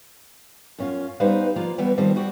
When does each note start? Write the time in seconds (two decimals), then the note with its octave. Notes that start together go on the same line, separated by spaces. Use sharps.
0.79 F#2 C#4 F4
1.20 G3 B3 D#4 B4 C5 F5
1.56 F3 A#3 F4
1.78 E3 F#3 G3 B3
1.98 D#3 F3 G3 C4
2.16 G3 F#4 G4